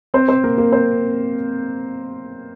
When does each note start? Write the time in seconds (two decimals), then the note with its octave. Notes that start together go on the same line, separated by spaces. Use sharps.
0.14 C4 C5
0.28 C4 C5
0.44 A#3 A#4
0.58 A#3 A#4
0.72 C4 C5